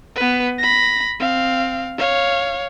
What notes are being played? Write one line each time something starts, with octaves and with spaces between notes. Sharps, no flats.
B3 B4
B5 A#6
C4 F5
C#5 F5